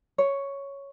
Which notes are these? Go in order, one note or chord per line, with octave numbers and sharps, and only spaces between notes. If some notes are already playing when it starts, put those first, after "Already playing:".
C#5